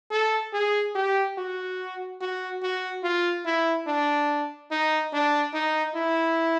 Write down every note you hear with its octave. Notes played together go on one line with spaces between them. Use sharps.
A4
G#4
G4
F#4
F#4
F#4
F4
E4
D4
D#4
D4
D#4
E4